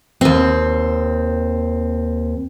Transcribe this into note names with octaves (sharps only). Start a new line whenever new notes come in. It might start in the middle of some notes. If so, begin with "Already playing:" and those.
D#2 C4